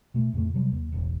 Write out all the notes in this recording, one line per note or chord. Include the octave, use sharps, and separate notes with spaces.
B2 A3
F2 A2 C#3 A3
C3 F#3 G3
D#2
E1 A1